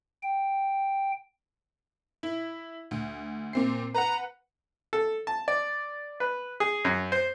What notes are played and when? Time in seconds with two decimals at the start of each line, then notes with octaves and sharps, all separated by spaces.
0.23 G5
2.23 E4
2.91 D2
3.53 A#2 C4 C7
3.95 B4 F#5 A#5
4.93 A4
5.27 A5
5.48 D5
6.20 B4
6.60 G#4
6.85 F#2
7.12 C5